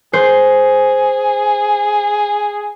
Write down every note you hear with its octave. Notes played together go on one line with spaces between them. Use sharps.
G#4 C5